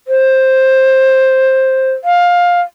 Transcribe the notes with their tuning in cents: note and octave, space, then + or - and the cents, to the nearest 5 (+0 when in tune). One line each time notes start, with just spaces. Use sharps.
C5 +10
F5 +15